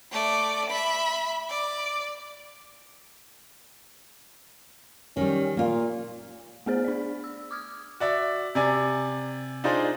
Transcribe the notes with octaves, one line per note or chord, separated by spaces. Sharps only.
A3 D5
E5 B5
D5
D#3 G3 C#4
A#2 A#3 F4
A3 B3 G#4 C5
D4 D5
E6
D6 D#6 F6 G#6
F#4 D5 E5
C3 D5 G#5
D4 D#4 F4 G#4 C5 D5